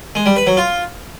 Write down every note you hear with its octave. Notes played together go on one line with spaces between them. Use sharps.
G#3
G3
B4
F#3
F4